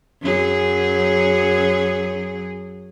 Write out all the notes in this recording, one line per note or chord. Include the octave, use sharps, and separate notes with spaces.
F#2 F#3 G#4